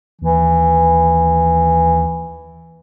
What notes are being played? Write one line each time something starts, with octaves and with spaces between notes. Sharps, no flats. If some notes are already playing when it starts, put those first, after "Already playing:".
D#2 E3